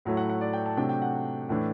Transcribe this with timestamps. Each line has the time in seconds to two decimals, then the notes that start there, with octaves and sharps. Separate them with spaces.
0.05 A2 F#3 A3 E4
0.17 F#5
0.29 F#5
0.41 D5
0.53 G5
0.66 A5
0.77 C3 F#3 A3 D4 G5
0.89 G5
1.02 F#5
1.49 A2 E3 A3 D4